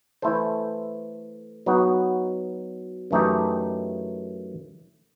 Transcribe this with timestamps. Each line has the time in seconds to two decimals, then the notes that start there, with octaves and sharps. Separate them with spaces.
0.22 E3 A3 E4 A4 C5
1.66 F#3 B3 D#4 F#4
3.11 F#2 E3 A3 D#4 G4